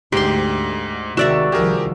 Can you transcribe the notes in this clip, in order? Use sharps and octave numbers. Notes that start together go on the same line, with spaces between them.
D2 G#2 G4 C6
C3 D#3 G#3 F#4 D5 E5 E6 E7
C2 D#3 F3 G4 G#4 A#4